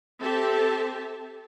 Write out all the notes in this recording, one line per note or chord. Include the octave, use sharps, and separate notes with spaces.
C4 G4 A4 E5 A5